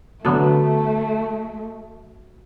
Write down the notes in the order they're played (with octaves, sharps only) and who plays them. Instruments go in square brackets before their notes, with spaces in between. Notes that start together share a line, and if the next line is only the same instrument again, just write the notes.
[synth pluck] D3 B3 A4 [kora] F#3 [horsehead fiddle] A3